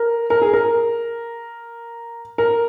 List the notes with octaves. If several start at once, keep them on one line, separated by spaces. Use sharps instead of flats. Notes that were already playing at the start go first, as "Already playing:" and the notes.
Already playing: A#4
A#4
G#4
A#4
A#4